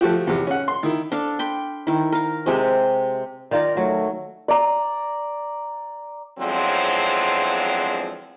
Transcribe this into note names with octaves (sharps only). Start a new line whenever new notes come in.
F3 A3 F#4 G4
E2 C3
C#4 F#5
C6
D#3 E4
D4 A4 F5
G5 B5 C6
D#3 E4
A#4 F5
C3 G#3 G4 E5
D#3 F4 A#4 D5
F#3 A3
D5 A#5
E2 D3 F3 F#3 G#3 C4